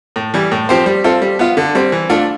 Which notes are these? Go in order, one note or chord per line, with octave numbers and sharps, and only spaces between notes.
A2
E3 G3
A2
F3 C4 G4 C5
G3
C4 F4 A4
G3
B3 F4
D3
G3 C4
E3
A3 D4 F4 A4